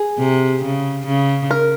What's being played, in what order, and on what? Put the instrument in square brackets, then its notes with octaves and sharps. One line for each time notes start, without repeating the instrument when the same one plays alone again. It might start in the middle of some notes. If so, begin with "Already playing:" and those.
Already playing: [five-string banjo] G#4
[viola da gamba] C3
C#3
C#3
[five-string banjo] A#4